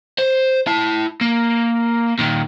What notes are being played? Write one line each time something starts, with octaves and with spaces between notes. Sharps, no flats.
C5
E4 A5
A#3
A#2 D#3